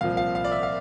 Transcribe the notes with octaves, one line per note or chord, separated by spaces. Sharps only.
C2 A#2 F3 F5
F5
F5
D5
E5
F5